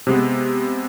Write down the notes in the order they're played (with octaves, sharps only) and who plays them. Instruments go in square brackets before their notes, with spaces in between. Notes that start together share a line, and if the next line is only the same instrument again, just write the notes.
[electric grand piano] C3 G#3 B3